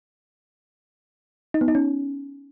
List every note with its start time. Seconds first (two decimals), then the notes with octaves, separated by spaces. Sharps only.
1.54 D#4
1.61 B3
1.68 D#4
1.75 C#4